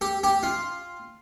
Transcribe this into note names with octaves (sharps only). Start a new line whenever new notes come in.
G4
G4
F4